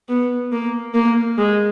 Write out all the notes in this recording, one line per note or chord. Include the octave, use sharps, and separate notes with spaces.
B3
A#3
A#3
G#3